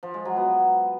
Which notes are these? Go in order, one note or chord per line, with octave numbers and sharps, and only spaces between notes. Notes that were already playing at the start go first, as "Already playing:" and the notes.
F3
G#3
F#3
B3